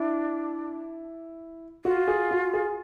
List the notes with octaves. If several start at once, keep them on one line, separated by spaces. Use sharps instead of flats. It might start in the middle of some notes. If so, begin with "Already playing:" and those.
Already playing: D4 E4
F4 F#4
G#4
F#4
G#4